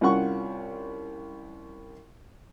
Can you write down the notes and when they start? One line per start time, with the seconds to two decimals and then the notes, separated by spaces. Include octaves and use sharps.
0.01 C2 C#4 F4 F#5 C#6